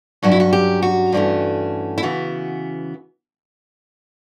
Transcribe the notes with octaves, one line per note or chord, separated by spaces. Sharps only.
G2 F#3 C#4 F#4
E4
F#4
G4
F#4
G2 E3 A3 C#4
E4
C#3 E3 B3 F#4